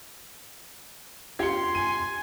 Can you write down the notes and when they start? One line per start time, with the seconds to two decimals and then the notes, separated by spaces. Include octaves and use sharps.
1.39 F4 G4 C6 G#6 C#7
1.75 G#5 D#7